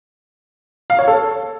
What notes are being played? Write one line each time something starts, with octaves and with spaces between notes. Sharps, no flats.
F5
C#5
A4